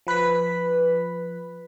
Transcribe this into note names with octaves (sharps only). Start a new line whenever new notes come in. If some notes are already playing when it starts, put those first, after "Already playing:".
F3 B4 F#6 B6